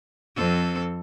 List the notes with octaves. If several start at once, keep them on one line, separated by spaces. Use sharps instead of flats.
F2 C4 A4